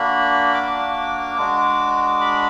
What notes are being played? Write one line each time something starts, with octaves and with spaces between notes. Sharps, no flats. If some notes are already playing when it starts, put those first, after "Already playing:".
Already playing: A#3 D4 F#4 B5
D6
G#3 D4 F#4
B5